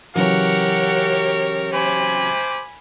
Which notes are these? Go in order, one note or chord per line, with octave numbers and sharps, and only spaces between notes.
C#3 E3 F#3 G4 A#4 C#5 F#5
C5 G#5 B5 D6